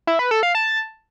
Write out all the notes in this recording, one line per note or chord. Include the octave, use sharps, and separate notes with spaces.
E4
B4
A4
F5
A5